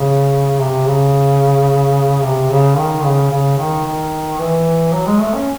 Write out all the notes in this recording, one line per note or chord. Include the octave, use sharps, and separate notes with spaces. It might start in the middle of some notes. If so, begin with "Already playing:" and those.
Already playing: C#3
C3
C#3
C3
C#3
D#3
C#3
C#3
D#3
D#3
E3
F#3
G#3
A3
C#4